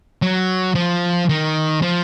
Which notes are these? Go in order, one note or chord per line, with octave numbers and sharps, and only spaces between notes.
F#3
F3
D#3
F3